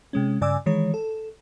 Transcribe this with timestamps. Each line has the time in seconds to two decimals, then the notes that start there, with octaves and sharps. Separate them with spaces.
0.13 C3 G#3 C#4
0.41 G2 C#3 D5 G#5 D6 E6
0.66 D#3 E3 G#3 C#5
0.94 A4